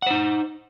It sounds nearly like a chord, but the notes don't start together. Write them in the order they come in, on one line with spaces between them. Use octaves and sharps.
F#5 C5 D#4